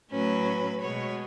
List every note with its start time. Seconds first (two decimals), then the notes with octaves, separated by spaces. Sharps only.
0.12 A2 F#3 C#4 B4
0.80 B2 G#3 B3 C#5